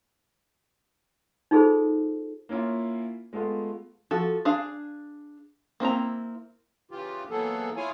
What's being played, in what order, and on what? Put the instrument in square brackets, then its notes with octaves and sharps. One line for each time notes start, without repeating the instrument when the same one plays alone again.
[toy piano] D#4 F4 G#4 A4 C5
[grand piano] A#3 C#4 E4 F4
G#3 A3 B3 F4
[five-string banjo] F3 F#4 A4
D4 G#4 F5
A#3 C4 E4 A#5
[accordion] C#3 E3 F4 G4
E3 F#3 A#3 B3 G#4 A4
E4 F4 G#4 C#5 F5 G#5